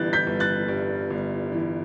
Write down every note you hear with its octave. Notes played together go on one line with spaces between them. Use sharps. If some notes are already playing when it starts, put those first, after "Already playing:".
Already playing: G1 G2 E3 F#6 G6 A6
G6 B6
G1
F#6 A6
G2
G1
E3